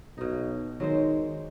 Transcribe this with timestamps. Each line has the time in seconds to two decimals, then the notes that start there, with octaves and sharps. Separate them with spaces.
0.18 B1 B2 D#4
0.80 D#3 F#3 G#3 C5